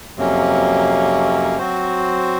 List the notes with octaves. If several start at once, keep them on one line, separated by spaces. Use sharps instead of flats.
F2 C3 F#3 A#3 C#4
F#3 C4 F#4 C5